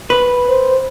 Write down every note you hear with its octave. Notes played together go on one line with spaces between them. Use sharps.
B4
C5